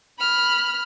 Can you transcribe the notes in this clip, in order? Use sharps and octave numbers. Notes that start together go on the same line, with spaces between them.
B5 F6